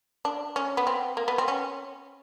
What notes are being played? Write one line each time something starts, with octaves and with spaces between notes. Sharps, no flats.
D4
C#4
B3
C4
A#3
B3
C4
C#4